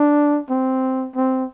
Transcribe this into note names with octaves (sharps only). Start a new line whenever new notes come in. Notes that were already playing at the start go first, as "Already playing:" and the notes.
Already playing: D4
C4
C4